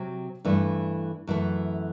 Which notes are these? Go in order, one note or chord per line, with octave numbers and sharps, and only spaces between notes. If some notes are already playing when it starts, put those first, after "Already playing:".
Already playing: C3 F#3 C4
G2 E3 A3
F#2 E3 A3